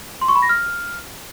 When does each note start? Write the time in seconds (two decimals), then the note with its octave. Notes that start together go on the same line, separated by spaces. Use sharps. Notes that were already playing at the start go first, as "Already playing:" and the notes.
0.21 C6
0.28 C#6
0.35 B5
0.42 A#6
0.49 F6